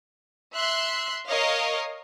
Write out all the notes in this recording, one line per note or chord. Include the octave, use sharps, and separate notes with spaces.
E5 C6 F#6
A#4 C#5 D#5 F5